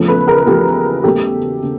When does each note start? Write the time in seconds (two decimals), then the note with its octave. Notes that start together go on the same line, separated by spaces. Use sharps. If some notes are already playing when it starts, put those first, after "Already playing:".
Already playing: E2 C#3 F3 A3
0.08 A4 B4
0.27 G#4 A#4
0.46 E2 C#3 F3 A3 G4 A4
1.04 E2 C#3 F#3 A3 G4 A4
1.63 C#3